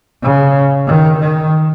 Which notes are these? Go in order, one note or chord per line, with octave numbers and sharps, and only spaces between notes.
C#3
D#3
D#3